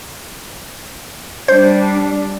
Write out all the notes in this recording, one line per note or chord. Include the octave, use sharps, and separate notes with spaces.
G3 D4 C5 G6